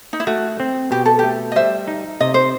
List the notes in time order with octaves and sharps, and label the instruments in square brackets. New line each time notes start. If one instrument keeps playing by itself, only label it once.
[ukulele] D#4
E4
[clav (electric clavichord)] A3 [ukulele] F#4
[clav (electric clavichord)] C4
[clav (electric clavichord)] B2 [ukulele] G4
[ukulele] A4
[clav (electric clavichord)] A3 [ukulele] G4
[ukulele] D#5
[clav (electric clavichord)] G3 [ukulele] C5 E5
[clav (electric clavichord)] D#4
[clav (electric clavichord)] C3 [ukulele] D#5
[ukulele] C5